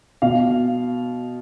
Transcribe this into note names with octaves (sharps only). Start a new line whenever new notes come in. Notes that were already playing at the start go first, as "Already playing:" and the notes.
B2 F5